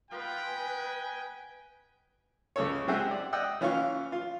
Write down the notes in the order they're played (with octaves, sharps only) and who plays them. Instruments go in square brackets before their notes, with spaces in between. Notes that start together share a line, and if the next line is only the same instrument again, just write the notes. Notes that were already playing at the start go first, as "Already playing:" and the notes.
[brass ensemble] F4 [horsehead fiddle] B4 [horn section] D#5 F#5 G5
[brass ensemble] G#5
[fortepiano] C#2 C#3 A4 C#5
G#3 C4 G4 E5 F#5 G#5
D5
D5 D#5 F#5 G5 E6
E3 C#4 F4 F5 C#6
F4